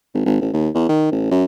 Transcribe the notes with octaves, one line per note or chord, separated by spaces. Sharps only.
G#1
G#1
A1
D#2
E2
D#3
A1
F#2